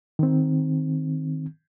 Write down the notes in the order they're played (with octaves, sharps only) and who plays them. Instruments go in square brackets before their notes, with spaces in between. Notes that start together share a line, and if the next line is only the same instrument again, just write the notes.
[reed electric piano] D#3 C4